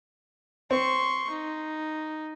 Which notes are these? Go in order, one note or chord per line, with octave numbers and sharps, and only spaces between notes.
C4 C6 C#6
D#4